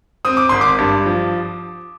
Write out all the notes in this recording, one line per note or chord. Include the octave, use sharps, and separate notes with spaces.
C4 D#6
D6
G#1 C6
D6
G2
F3